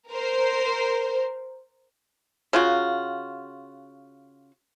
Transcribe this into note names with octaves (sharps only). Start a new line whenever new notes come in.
A#4 C5
C#3 F4 F#4